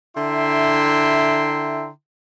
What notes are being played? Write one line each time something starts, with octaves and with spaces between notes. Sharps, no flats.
D3 E4 E5 G5 A#5 C6